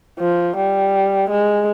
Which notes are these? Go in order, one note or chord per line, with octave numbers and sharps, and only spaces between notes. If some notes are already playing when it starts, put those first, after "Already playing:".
F3
G3
G#3